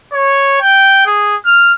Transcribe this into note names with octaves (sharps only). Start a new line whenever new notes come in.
C#5
G5
G#4
F6